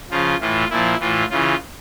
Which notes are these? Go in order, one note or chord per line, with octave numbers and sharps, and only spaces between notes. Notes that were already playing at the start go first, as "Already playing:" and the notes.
C#3 F3 F4
A2 E3 F4
A#2 F3 E4
A2 E3 F4
C#3 E3 F4